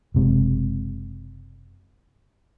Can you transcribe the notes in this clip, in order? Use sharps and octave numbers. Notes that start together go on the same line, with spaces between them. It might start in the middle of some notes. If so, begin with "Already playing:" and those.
F#1 C3 G#3